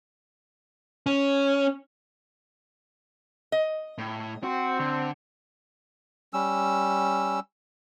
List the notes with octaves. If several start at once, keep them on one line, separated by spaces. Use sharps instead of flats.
C#4
D#5
A2
C4 F#4
D3
G3 C#4 E6